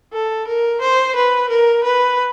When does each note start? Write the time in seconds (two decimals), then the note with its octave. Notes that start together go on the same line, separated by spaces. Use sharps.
0.13 A4
0.47 A#4
0.81 C5
1.16 B4
1.49 A#4
1.84 B4